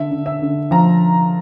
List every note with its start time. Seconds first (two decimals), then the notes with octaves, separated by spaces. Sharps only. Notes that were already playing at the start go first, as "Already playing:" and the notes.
Already playing: D3 E5
0.11 D3
0.26 E5
0.42 D3
0.71 F3 A#5